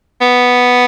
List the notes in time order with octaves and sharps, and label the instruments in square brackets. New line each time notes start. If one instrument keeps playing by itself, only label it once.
[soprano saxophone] B3